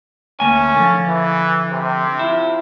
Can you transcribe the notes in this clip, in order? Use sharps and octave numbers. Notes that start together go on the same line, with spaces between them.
D2 A#3 C#4 G#5
D3 F3
E3
C3
E4 F4